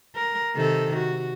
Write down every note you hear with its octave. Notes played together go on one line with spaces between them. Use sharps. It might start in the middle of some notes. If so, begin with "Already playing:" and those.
A#4
C3 D#3 A4
F#4